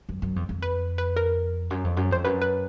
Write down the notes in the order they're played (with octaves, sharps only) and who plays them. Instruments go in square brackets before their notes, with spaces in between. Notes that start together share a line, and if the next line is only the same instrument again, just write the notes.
[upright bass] F#2
F#2
F2
F2
[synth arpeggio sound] B4
B4
A#4
[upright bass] F#2
F2
F#2
[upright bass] F2 [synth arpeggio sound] C5
[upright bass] F#2 [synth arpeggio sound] B4
[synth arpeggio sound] B4